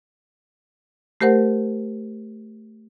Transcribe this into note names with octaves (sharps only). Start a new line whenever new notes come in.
A3 G4 A#4 C5 F#5